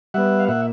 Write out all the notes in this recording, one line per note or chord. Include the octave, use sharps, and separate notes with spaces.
G3 B3 E5 F#5
F5
A#2 E5 F#5